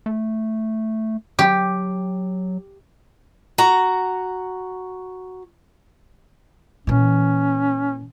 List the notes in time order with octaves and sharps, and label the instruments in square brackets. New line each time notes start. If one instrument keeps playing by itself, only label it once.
[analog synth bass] A3
[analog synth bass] F#3 [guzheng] G4
[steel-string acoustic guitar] F#4 A#5
[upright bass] A#2 E3 [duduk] C#4